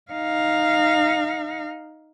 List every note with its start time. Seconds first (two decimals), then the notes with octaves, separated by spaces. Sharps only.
0.12 D#4 F5